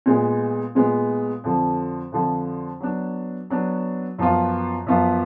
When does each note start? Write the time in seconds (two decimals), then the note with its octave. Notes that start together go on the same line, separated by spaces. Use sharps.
0.06 A#2 G#3 B3
0.75 A#2 G#3 B3
1.44 F2 D3 F3
2.12 F2 D3 F3
2.80 F#3 B3 D4
3.50 F#3 B3 D4
4.18 F#2 F3 B3 F4
4.86 F#2 F3 B3 F4